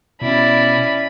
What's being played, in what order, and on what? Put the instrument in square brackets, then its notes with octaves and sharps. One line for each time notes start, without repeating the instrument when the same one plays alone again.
[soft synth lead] B2 [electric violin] C#4 B5 [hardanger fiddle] E4 D5